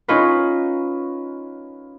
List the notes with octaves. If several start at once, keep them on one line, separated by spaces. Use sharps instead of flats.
C#4 D#4 F4 B4